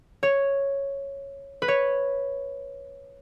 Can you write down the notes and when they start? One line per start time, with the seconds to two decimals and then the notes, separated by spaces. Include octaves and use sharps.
0.23 C#5
1.62 B4
1.68 C#5